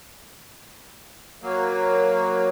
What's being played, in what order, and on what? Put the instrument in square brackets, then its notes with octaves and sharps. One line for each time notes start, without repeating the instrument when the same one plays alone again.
[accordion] F#3 A#3